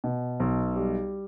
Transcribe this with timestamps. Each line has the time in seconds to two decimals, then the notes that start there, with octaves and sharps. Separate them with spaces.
0.04 B2
0.40 B1
0.76 G3